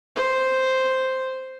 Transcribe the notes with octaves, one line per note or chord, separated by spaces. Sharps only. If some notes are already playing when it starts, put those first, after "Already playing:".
C5